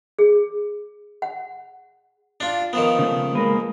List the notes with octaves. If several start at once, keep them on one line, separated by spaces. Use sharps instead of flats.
G#4
F#5
D4 F4
D#3 F3 B3
C#3 A3
G#3 A#3 B4